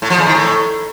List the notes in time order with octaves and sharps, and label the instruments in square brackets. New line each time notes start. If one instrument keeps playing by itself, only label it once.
[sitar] A2
F3
E2
D#3
A2